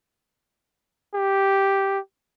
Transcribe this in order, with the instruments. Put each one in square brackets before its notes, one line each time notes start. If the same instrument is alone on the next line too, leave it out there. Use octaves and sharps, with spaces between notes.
[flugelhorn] G4